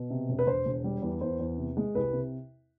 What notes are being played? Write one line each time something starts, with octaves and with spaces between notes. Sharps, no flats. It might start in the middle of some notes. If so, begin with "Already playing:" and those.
Already playing: B2
C3
E1
B4
E1 C5
E1
G3
E2
E2 C5
E2
C3
G#3
C2 B4
C3